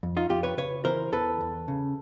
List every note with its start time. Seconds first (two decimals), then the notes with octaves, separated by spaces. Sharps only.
0.03 F2
0.17 D#4 F4
0.30 F2 F4 G4
0.43 B4 C#5
0.57 C#3 B4 C#5
0.85 E3 A#4 C5
1.12 E2 A4 B4
1.41 E2
1.68 C#3